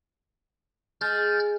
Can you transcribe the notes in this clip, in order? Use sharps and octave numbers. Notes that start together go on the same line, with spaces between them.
G#3 F6 G6 A6